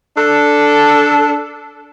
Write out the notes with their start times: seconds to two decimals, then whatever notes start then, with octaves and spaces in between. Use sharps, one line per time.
0.16 D4 A4